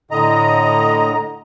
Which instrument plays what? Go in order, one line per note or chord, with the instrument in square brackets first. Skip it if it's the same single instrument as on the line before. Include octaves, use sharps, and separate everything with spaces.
[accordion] A2 D3 D#5 A#5